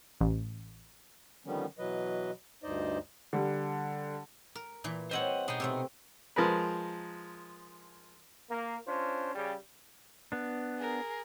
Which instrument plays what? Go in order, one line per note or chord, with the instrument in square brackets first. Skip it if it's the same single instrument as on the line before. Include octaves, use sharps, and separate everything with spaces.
[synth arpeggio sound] A1
[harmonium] D3 D#3 F3 G3 B3 C#4
B2 E3 F#3 B4 D#5
D2 G2 D#4 C5 D5 D#5
[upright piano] D3 G3
[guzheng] A#4
A#2 E3
[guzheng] G3 C4 C#5 [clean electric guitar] C5 D#5 F#5
[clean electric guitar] B2 D#4 G#4 [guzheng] B3 G5
[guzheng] C3 A3 C4
[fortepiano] F3 G#3 A#4 B4
[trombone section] A#3
C#4 D4 F4 C5
C#3 G3
[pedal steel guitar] B3 D4
[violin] G#4 A#4